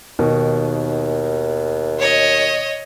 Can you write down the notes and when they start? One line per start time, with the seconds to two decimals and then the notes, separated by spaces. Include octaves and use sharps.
0.19 D#2 B2 D#3
1.99 C#5 D#5